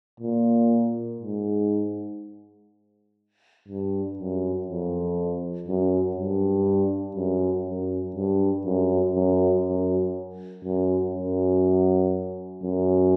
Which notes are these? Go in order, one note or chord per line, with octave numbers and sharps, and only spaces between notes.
A#2
G#2
G2
F#2
F2
F#2
G2
F#2
F#2
G2
F#2
F#2
F#2
F#2
F#2
F#2